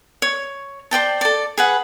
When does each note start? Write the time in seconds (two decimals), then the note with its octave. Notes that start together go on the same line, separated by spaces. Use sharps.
0.22 C#5
0.91 C5 D5 G5 A5
1.21 A4 D5
1.58 G#4 B4 F#5